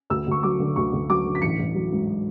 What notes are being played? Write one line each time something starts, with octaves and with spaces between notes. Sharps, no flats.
D2 E6
D2 C#6
F#3 D6
D3
D2 C#6
D2
F#3 D6
D3
B6
A1 C#7
A1
F#3
G#2